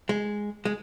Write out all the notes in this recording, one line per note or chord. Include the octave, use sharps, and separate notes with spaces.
G#3
G#3